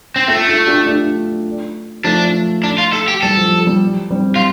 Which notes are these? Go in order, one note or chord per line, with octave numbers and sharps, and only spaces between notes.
C4
A3 F4 A4
F4 A4
D4 G4
A3 D4
F3 A3 D4
D4
F4
A4
G4
G3 A4
F3
F3
G3
G3 C4
F4